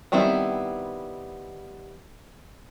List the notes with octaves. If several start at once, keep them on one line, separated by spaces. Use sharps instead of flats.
D#3 G3 B3 C4 E4